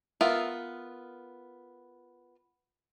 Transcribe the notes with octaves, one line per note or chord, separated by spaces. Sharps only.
B3 F4 A#4 E5